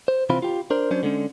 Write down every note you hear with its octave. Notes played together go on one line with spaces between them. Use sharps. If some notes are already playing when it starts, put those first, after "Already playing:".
C5
C3 E3 C4 F4 B5
F4 G4
D4 A#4 C5
F#3 C#4 D4 C5
D3 G#3 C#4